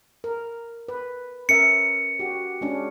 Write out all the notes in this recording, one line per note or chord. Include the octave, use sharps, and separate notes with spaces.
A#4
B4
C#4 A#4 E5 C#7
F#4 G4
G#3 C#4 D4